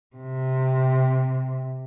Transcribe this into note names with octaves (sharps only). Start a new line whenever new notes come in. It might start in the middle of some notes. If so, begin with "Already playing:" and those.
C3